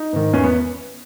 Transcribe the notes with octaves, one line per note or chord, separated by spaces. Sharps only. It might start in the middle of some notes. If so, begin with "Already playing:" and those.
Already playing: D#4
G#2 D#3
E2 C#4
B3